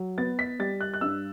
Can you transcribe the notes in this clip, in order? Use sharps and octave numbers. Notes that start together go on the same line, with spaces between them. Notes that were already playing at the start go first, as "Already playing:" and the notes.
Already playing: F#3
B3 A6
B6
G3 A6
F#6
F#6
G2 E6